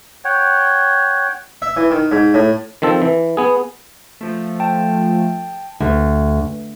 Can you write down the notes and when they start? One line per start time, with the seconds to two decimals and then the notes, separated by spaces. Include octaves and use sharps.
0.24 C#5 F#5 G5
1.62 E5
1.77 E3
1.91 D#3
2.12 G#2
2.34 A2
2.82 D#3 F3 C4 A4
3.02 E3
3.37 B3 G#4
4.21 F3 A3
4.60 G5 A5
5.80 D2